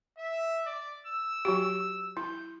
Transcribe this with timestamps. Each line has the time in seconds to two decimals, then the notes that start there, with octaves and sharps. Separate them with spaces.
0.18 E5
0.66 D5
1.07 E6
1.45 F#3 F#4 G4
2.17 E4 G6